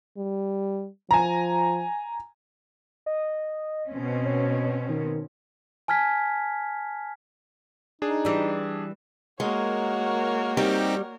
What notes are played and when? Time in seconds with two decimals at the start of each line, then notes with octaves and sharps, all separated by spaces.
0.18 G3
1.11 F3 G#5 A#5
3.06 D#5
3.88 B2 C4 C#4
4.25 C#5
4.89 D#3
5.88 G#5 A5 F6 G#6 B6
8.02 D4 D#4 G#4
8.25 E3 G3
9.40 G#3 A#3 F#4 A#4 C#5
10.57 G3 C4 D#4 G4